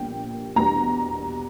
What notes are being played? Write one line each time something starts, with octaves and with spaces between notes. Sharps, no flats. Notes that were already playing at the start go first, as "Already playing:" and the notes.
Already playing: A#1 A#2 G3 B3 G5
E2 B2 G3 B3 D4 A#5